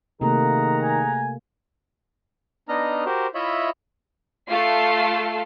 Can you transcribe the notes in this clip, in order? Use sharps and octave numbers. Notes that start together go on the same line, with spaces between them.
C3 D#3 A3 A#3 G#4 F#5 A#5
G#5
B3 D4 D#4 D#5 A#5 F6
F#4 G4 A#4 C5
E4 F4 C#5 D#5 E5 B5
A3 F4 A4 C7